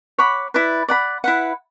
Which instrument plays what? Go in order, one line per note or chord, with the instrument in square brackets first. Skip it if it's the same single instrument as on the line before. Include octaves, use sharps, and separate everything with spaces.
[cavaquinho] C#5 F#5 B5 D6
E4 B4 D5
D5 F#5 B5
E4 B4 F#5